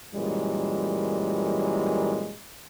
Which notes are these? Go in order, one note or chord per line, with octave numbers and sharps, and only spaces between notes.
F#2 A#2 E3 G3 G#3